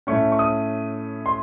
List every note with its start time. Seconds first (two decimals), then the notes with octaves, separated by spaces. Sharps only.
0.07 A2 A3 C#4 C#6
0.32 C#6
0.39 D#6
1.26 C6